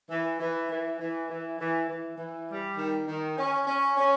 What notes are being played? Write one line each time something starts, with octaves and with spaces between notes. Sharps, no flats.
E3
E3
E3
E3
E3
E3
E3
E3
G3
D#3
D#3
C#4
C#4
C#4